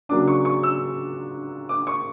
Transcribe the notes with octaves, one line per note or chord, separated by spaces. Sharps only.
C#3 F#3 A#3 D4 D6
C#6
C#6
E6
D6
C#6